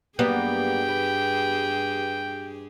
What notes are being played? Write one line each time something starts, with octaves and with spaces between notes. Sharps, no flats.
G2 F#3 G3 A#3 B3 G4 G#4 G5
B4